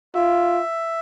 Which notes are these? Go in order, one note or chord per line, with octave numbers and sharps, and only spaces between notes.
F4 E5